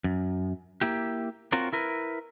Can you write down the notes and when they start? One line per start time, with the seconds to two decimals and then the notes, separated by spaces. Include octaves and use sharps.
0.04 F#2
0.81 A#3 E4 G4
1.52 C4 F4 F#4 A#4 C#5
1.73 E4 A#4 B4